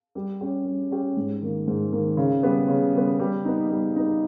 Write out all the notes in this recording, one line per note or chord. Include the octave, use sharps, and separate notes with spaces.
G3
C#4 G4
G3
C#4 G4
G#2
D#3 A#3
G#2
D#3 A#3
C#3
G3 B3
C#3
G3 B3
G3
B3 D#4
G3
B3 D#4